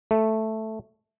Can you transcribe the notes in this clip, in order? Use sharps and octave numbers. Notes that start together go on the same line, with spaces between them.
A3